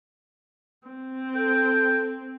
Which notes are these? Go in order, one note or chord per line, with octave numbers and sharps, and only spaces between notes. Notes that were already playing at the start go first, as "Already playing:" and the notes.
C4
A4 G5